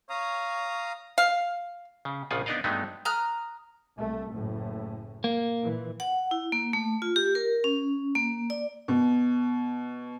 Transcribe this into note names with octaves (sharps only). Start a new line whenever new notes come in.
C#5 F5 A#5 D#6
F5
C#3
A#1 C#3 F3 F4 F#5 G#5
B3 D4 D#4 D5 D#5 F5
G2 F#3 G#3 A3 B3 D#4
A#5 D#6 F6 F#6
C2 A3
F#1 A2
A#3
A#2 E3
F#5
E4
A#3
A3
F4
G4
A#4
C#4
A#3
D5
B2